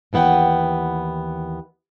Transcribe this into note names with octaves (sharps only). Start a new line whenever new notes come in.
D#2 E3 B3 F#5 G5